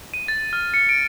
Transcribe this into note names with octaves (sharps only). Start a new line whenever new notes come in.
D#7
A6
F6
C#7
D7